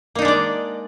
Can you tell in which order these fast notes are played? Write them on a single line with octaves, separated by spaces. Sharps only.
A#3 D#4 D4 G#3 D5